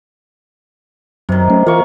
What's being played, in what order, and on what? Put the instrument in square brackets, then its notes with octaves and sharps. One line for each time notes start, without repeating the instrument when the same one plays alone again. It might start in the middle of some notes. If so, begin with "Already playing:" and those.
[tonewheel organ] F#2 F#3 [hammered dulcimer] C3 D#3
[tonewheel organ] F#3 A3 C#4
[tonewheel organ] E3 F4 A#4 [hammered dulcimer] A#3 C#6